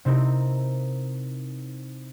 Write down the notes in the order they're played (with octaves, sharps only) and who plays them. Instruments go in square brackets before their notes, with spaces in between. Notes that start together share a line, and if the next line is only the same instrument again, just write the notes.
[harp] C3 C4 D#4 E4 A#4